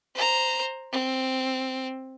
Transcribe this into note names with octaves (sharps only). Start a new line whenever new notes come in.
C5 A#5
C4